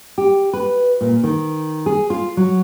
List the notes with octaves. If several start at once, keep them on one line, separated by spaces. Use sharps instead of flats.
G4
B4
A#2
D#3
G#4
F4
F#3